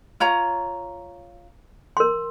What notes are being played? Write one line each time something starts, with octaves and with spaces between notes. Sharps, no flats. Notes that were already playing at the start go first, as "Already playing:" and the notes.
F4 C#5 A#5
A#4 C6